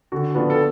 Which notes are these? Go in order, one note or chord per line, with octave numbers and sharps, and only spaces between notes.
D3 F#4
F3 B3 D4
A4